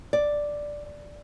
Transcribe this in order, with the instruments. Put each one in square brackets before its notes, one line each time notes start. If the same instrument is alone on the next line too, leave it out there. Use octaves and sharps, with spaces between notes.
[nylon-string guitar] D5